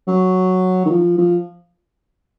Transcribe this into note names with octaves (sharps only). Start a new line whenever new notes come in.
F#3
D#3
F3
F3